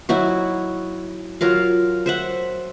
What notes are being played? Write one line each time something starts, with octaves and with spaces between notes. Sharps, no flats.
F#3 D#4 E4 F#4
F#3 F4 A#4 F5
C5 E5 F#5